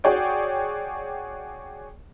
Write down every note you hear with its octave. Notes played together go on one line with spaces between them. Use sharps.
F#4 G#4 C#5 D5 G5